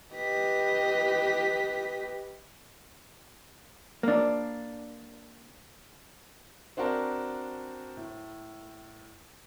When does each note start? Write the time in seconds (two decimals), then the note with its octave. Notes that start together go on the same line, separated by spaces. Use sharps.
0.15 G4 B4 D#5 B6
4.03 A#3 D4
6.77 C4 D4 F#4 A#4 A5
7.97 A2